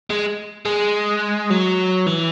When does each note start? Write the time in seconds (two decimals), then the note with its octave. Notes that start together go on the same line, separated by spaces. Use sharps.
0.10 G#3
0.66 G#3
1.51 F#3
2.07 E3